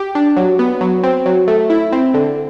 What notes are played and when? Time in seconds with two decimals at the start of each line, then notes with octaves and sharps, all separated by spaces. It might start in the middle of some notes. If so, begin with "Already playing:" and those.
Already playing: G4
0.15 D4
0.37 F#3
0.59 B3
0.81 F#3
1.03 C4
1.26 F#3
1.48 A3
1.70 E4
1.92 C4
2.14 D3